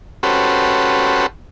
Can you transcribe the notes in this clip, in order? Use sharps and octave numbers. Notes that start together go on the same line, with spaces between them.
C#4 F#4 G4 A4 B4 C5